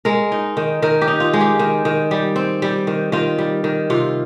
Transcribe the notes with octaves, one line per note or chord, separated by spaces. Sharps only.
G#3 A#4
D#4
D#3
D#3 A#4
G4
D#4
F4
G#3
G4
D#3
D#3
G3
C4
G3
D#3
D#3 F4
G3
D#3
C3 F4